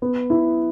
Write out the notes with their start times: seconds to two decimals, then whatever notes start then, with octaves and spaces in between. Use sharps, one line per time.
0.02 B3
0.30 E4